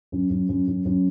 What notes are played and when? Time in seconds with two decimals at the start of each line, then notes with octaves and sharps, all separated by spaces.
0.12 F#2
0.30 F#2
0.49 F#2
0.67 F#2
0.85 F#2